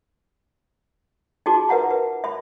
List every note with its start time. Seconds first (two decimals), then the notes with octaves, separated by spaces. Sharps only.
1.46 D#4 F4 F#4 G#4 A5 D6
1.69 A#4 B4 E5 F#5 A#5
1.91 B4
2.24 E5 B5